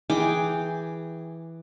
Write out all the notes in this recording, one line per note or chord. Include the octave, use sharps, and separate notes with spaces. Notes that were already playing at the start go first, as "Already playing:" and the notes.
E3 G#4 G5 D6